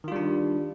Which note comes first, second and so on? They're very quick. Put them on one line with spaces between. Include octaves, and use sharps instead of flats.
D#3 F4 G3 D4